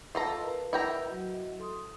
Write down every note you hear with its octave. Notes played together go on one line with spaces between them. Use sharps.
F4 A4 D#5 A5 A#5
A#4 B4
E4 G5 A#5
F#3 F#4 D#5
A4 C6 D#6